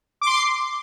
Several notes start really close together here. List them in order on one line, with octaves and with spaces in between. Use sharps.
D6 C6 C7